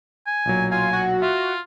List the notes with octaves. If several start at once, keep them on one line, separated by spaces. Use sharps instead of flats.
G#5
B1 A#2 F#3
F4 G#5
F#4
F4 E5